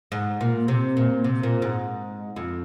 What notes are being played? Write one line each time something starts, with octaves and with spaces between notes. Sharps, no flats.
G#2
A#2
C3
A#2
C3
A#2
G#2
F2